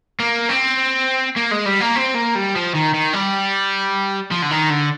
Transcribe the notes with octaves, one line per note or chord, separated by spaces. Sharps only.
A#3
C4
A#3
G#3
G3
A#3
C4
A#3
G3
F3
D#3
D#3
G3
F3
D3
D#3
D3